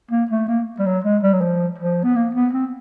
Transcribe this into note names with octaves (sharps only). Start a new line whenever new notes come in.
A#3
A3
A#3
G3
F#3
G#3
G3
F#3
F3
F3
B3
A#3
B3
C4